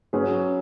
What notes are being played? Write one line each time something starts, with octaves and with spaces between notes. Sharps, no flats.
F#3 C#4 G#4 B4